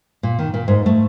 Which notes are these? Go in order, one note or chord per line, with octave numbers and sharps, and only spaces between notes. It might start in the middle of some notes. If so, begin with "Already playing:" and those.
A#2
D#3
A#2
G#2
A3